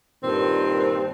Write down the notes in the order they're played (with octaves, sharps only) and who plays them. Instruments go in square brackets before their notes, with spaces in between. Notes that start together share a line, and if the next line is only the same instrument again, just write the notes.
[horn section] G2 A#2 D#3 C4